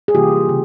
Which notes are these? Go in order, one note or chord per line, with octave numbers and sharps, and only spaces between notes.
G#4
C3 E3 G3 A#3 F4 G4
C#3